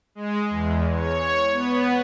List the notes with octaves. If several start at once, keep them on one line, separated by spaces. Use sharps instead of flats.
G#3
E2
C#5
B3